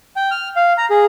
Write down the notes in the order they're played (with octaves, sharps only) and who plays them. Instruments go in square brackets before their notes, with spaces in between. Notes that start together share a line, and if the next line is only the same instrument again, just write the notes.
[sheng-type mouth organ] G5
F6
F5
A#5
G#4